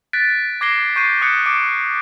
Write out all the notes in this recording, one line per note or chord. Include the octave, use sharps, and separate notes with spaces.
F#6 A6 B6 D7
D6 G#6 A#6 C7 D7 G7
C#6 G6 C7 D#7
D6 D#6 F#6 C#7
D6 D7